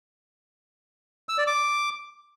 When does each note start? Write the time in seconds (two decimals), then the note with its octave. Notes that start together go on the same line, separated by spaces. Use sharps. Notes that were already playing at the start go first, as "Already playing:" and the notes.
1.29 E6
1.38 D5
1.47 D6